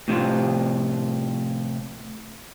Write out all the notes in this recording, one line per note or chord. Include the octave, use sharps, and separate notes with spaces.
A2 C3 F3 F4